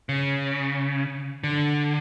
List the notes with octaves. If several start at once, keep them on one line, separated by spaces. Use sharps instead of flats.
C#3
D3